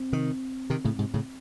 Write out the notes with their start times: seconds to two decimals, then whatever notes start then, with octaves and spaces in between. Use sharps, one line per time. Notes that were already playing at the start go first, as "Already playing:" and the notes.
Already playing: C4
0.12 C3 D#3
0.70 C3 D#3
0.84 A2 C#3
0.98 G#2 C3
1.14 A2 C#3